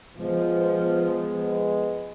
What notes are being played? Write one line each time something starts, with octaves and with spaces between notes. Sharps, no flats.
F3 G#3 B3